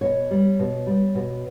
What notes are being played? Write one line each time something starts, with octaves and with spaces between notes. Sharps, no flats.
B2 C#5
G3
B2
G3
B2